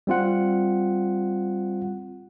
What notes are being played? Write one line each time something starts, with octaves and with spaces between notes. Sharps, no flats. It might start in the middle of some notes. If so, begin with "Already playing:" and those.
G3 C4 F4 F#5